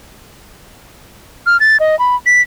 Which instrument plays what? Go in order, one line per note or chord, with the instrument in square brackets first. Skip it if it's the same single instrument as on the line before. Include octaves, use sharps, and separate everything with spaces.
[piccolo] F6
A6
D#5
B5
B6